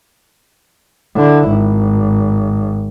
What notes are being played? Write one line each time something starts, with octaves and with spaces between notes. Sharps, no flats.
D3 E4
G#1